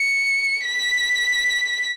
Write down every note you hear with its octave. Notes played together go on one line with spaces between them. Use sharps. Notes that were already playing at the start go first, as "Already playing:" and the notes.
Already playing: C#7
B6